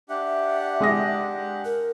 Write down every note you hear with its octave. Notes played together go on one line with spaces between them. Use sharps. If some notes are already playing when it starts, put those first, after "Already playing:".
D4 G4 E5 F#5
G#3 D#6 A#6
A#4